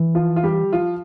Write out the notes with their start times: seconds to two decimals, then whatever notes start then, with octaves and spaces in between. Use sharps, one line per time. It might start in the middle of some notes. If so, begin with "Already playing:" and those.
Already playing: E3
0.15 F3 F4
0.36 F4
0.43 G3 G4
0.73 F3 F4